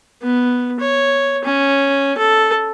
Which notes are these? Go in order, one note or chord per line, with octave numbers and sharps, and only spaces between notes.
B3
C#5
C#4
A4